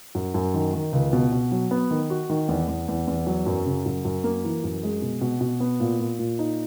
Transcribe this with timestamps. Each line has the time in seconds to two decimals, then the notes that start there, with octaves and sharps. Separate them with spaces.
0.15 F#2
0.34 F#2
0.54 D#3
0.74 D#3
0.93 C#2
1.13 B2
1.32 B2
1.52 F#3
1.71 B3
1.91 D#3
2.10 F#4
2.30 D#3
2.48 E2
2.68 E2
2.88 E2
3.08 E2
3.27 F#3
3.46 F#2
3.66 C#3
3.86 F#2
4.05 F#2
4.24 A#3
4.44 E3
4.64 F#2
4.83 G#3
5.02 B2
5.21 B2
5.41 B2
5.60 B3
5.80 A#2
5.99 A#2
6.19 A#2
6.39 D#4